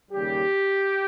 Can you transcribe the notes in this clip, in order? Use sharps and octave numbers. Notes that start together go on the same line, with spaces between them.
D#2 C#3 G3 G4